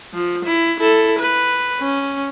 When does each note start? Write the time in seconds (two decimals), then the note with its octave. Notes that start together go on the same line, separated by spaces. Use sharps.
0.14 F3
0.45 E4
0.80 E4 A4
1.19 B4
1.80 C#4